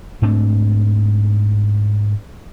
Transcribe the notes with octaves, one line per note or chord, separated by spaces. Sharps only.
G#2 A3 C4 D4